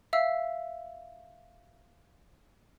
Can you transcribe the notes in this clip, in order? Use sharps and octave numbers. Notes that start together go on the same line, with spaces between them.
E5 F5 E6